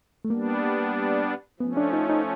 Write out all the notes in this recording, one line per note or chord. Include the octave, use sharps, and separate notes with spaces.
A3
G3 A#3 B3 D4
F3 A3 B3 C#4
D4
D#4
D#4